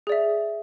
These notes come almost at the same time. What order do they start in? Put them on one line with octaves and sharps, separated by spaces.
G#4 D5 E5